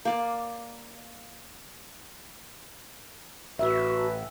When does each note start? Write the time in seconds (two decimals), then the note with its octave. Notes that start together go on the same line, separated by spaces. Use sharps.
0.05 A#3 D5
3.59 A1 F#4 B4 E5